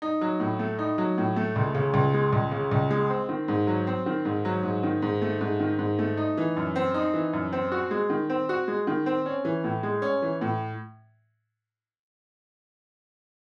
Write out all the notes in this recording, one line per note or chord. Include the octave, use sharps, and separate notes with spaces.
D#4
F#3
A2
A3
D#4
F#3
A2
A3
C#2
C#3
C#2
G#3
C#2
C#3
C#2
G#3
C4
D#3
G#2
F#3
C4
D#3
G#2
F#3
G#2
D#3
G#2
A3
G#2
D#3
G#2
A3
D#4
E3
F#2
C4
D#4
E3
F#2
C4
F#4
G#3
D#3
C4
F#4
G#3
D#3
C4
C#4
E3
A2
G#3
C#4
E3
A2